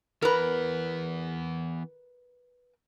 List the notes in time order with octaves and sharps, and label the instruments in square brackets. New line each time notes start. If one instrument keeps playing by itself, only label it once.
[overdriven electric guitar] E3 B3 [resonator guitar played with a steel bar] A#4 B4